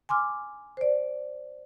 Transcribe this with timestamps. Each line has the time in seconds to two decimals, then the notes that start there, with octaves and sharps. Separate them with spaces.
0.09 G#5 C6 D6 F6
0.77 C5 D5